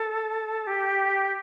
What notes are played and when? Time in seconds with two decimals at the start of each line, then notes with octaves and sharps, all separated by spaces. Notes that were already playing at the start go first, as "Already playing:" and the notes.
Already playing: A4
0.67 G4